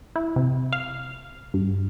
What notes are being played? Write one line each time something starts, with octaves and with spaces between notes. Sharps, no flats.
E4
C3
F5
G2